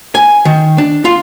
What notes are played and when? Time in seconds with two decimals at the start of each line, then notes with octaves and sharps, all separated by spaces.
0.15 G#5
0.45 D#3
0.78 D4
1.05 F4